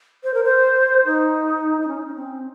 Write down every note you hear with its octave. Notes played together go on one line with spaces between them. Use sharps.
C5
A#4
C5
D#4
D#4
C#4
C#4
C4